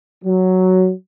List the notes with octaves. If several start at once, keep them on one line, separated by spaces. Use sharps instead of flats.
F#3